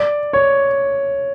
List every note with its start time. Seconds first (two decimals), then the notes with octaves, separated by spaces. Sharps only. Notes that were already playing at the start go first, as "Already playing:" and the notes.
Already playing: D5
0.33 C#5